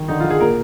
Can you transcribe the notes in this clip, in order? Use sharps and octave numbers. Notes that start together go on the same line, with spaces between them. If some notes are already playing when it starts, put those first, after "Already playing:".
Already playing: D#3
D3 D#4
D3 F4
G#4
A#2 A#4